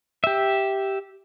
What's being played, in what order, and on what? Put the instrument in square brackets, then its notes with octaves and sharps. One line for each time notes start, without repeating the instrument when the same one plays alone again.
[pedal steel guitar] G4 E5